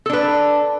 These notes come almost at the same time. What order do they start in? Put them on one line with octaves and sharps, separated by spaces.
A4 D4 B4